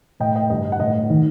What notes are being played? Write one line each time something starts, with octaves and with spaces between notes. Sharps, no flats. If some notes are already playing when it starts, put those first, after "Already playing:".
A2 D#5 G5
D#5 G5
G2 D3 D#5
F#5
A2 D#5
D#3